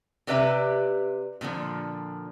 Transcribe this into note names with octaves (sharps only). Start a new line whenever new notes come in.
C3 G4 B4 D5 E5 A#5
A#2 D3 E3 F3